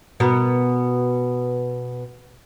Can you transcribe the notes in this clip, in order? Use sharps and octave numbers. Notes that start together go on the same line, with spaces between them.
B2 B3 A#4